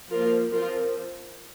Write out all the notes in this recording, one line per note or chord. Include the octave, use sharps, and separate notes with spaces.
F3 A#3 F4 A#4
F3 C4 F4 A#4